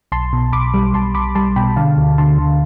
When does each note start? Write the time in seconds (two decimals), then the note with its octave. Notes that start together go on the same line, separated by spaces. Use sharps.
0.12 B1 A5 C6
0.33 B2
0.53 B1 B5 D6
0.74 G3
0.94 B1 A5 C6
1.15 B1 B5 D6
1.35 G3 A5 C6
1.56 B2 G5 B5
1.76 D3 F5 A5
1.97 D2
2.18 D3 A5 C6
2.38 D3